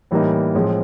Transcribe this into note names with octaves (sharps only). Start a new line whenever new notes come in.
A2 E3 G3 A#3 D#4
A2 F3 G#3 C4